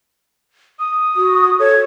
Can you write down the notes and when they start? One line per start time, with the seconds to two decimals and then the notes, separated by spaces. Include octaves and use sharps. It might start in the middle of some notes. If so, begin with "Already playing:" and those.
0.79 D#6
1.16 F#4
1.59 A4 C#5